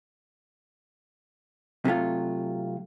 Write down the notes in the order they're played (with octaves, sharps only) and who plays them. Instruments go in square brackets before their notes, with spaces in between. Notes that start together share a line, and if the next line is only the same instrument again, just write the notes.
[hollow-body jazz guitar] C3 F#3 A3 F4